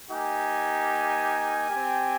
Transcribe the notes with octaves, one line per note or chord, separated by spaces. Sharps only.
A#3 D#4 G4 G#5
C4 G4